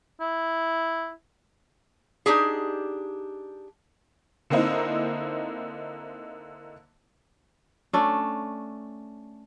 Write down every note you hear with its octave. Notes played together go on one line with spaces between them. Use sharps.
E4
D4 D#4 G4 G#4
D3 A#3 C4 D#4 E4
A3 C#4 D4